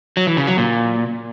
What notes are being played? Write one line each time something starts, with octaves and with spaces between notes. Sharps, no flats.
F#3
E3
C#3
F#3
A#2